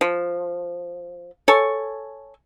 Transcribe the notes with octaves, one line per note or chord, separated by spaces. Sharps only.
F3
A4 C#5 G#5